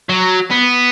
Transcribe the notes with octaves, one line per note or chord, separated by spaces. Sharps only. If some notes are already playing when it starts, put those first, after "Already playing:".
F#3
B3